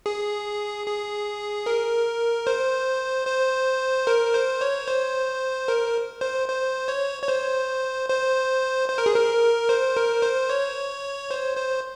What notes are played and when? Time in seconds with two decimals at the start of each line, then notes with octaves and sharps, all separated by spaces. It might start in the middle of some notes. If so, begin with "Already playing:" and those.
0.06 G#4
0.86 G#4
1.66 A#4
2.47 C5
3.27 C5
4.07 A#4
4.34 C5
4.61 C#5
4.88 C5
5.68 A#4
6.21 C5
6.48 C5
6.88 C#5
7.22 C#5
7.28 C5
8.09 C5
8.89 C5
8.98 A#4
9.06 G#4
9.16 A#4
9.69 C5
9.97 A#4
10.22 C5
10.49 C#5
11.31 C5
11.57 C5